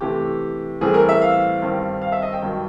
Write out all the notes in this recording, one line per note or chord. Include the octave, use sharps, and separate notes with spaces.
C3 E3 A3 G4
A2 E3 G3 C4 G#4
A#4
E5
F5
G2 D#3 G3 C4
F5
E5
D#5
G5
G2 D#3 F#3